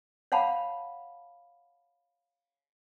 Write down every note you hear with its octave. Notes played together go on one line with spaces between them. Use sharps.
C#5 F5 F#5 A5 B5